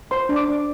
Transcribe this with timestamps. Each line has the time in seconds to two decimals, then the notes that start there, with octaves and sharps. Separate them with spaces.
0.11 C5 C6
0.29 D4
0.36 D6
0.48 D4